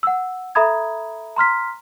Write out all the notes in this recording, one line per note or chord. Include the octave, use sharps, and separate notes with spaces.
F#5 E6
A4 E5 A#5 B5 D#6 G#6
A#5 C6 F6 B6